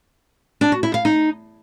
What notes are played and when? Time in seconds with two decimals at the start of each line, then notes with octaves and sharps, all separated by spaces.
0.61 D4
0.72 F#4
0.83 E4
0.94 F5
1.05 D#4